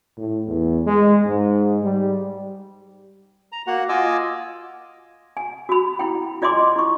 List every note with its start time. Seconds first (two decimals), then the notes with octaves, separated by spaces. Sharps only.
0.17 A2
0.47 E2
0.86 G#3
1.26 G#2
1.83 G3
3.52 A#5
3.67 A#3 F#4 F#5
3.89 F4 D#5 G#5 D6 E6
5.37 G#5
5.69 F#4 B5
5.99 E4 G5
6.42 F4 D5 D#5 G#5 C6 D6
6.76 E4 C#6